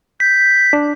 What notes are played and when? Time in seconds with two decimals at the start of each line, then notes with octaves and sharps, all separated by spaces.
0.20 G6 B6
0.73 D4